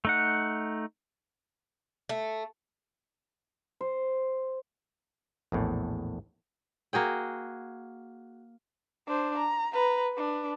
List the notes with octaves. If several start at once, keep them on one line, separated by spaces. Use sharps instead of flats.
A3 D#4 F#5
A3
C5
A#1 E2 A2
A#3 F#4 G#4 G5
D4 C5
A#5
B4 A#5
D4 B4